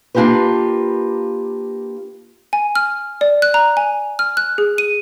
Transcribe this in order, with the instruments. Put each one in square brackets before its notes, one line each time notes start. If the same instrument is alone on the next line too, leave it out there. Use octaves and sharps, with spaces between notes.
[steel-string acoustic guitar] A#3 D4 F4 G4 A#4 B4
[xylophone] G#5
F6
D5
F#6
A#5
G#5
F6
F#6
G#4
D#7